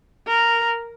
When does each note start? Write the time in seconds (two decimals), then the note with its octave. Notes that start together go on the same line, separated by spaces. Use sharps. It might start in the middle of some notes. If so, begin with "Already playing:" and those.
0.27 A#4